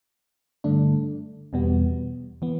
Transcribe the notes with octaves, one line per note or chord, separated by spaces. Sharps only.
G2 D3 A3 D4
E2 B2 G3 B3
E3 B3